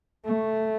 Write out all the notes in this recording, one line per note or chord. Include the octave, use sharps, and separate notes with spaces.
A3